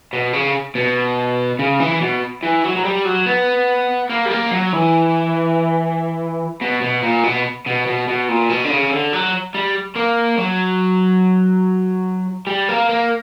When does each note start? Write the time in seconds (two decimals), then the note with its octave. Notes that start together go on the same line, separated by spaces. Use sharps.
0.13 B2
0.33 C#3
0.75 B2
1.59 C#3
1.80 E3
2.01 B2
2.43 E3
2.64 F#3
2.76 F#3
2.85 G3
3.05 F#3
3.26 B3
4.10 A#3
4.26 G3
4.31 A#3
4.52 F#3
4.73 E3
6.62 B2
6.82 B2
7.03 A#2
7.23 B2
7.66 B2
7.86 B2
8.07 B2
8.28 A#2
8.49 B2
8.64 D3
8.71 C#3
8.91 D3
9.13 F#3
9.54 G3
9.95 A#3
10.38 F#3
12.47 G3
12.69 A#3
12.89 A#3